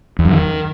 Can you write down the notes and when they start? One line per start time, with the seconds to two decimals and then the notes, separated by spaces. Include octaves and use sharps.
0.19 E2
0.25 F#2
0.31 D#3